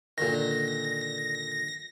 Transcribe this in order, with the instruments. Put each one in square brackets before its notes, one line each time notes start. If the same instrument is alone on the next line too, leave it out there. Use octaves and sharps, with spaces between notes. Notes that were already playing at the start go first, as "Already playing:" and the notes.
[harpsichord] A#2 D3 D#3 [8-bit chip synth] A#6